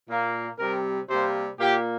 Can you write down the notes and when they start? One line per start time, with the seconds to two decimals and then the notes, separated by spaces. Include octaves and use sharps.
0.08 A#2 A#3
0.58 C3 G3 C4 A#4
1.09 C3 G3 A#3 C5
1.59 A#2 A#3 G4